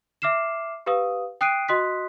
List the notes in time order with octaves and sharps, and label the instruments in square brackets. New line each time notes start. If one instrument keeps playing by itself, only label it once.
[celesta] E5 D6 F6 C7 E7
G4 B4 F5 D#6
G5 D#6 F#6 C7 D7 D#7
F#4 D#5 C6 D#6 F#6 B6